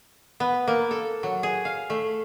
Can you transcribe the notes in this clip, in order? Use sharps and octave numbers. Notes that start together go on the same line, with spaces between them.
B3
A#3
A4
F#3
G#4
F5
A3